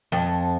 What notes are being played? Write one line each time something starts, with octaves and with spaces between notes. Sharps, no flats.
F2